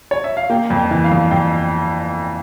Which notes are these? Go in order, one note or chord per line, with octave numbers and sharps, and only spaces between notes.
C#5
E5
F5
A#3 G5
F2
G5
E3
F5
F2
F2 G5